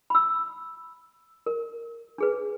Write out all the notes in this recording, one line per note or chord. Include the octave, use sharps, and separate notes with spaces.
B5 E6
A#4
D4 G#4 B4